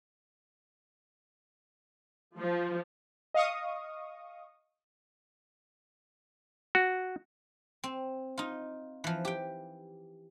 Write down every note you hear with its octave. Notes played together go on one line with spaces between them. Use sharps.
F3
D#5 F5 C#6 D#6
F#4
C4
D#4 F4
E3 F3
G4 G5